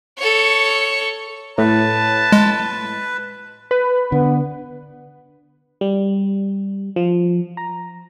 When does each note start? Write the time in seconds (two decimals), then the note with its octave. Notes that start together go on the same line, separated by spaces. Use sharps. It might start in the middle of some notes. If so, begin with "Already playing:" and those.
0.18 A4 C#5
1.58 A2 B4 A5
2.32 G#3
3.71 B4
4.12 D3 B3
5.81 G3
6.96 F3
7.57 A#5